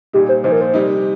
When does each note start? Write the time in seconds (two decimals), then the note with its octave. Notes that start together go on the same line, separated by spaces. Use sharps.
0.13 A#2 G3 D#4 G4
0.29 C5
0.44 A#2 F3 D#4 C5
0.52 A#4
0.61 C5
0.74 C3 G3 D#4